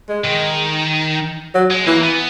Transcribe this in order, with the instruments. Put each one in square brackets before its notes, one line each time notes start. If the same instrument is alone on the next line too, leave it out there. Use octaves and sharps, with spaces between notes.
[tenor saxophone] G#3
[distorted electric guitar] D#3
[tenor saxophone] F#3
[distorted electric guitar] G#3
[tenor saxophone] E3 [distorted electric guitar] A#3
[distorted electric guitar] B3